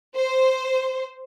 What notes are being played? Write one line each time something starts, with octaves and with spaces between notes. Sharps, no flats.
C5